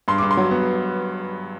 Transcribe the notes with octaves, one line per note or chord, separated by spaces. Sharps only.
G2 C6
G2 D6
C6
F#3
B3